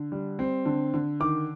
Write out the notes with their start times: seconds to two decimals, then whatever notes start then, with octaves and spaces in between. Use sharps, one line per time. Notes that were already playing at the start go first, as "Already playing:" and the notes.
Already playing: D3
0.12 G3
0.39 C4
0.65 D3
0.94 D3
1.20 D#3 D6